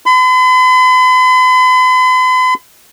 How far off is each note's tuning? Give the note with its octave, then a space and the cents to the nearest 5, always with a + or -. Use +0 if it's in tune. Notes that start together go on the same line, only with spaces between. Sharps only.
B5 +45